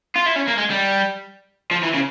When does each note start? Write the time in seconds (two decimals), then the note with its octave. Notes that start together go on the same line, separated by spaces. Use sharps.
0.15 F4
0.26 E4
0.36 C#4
0.47 A#3
0.58 G#3
0.70 G3
1.71 F3
1.83 E3
1.94 C#3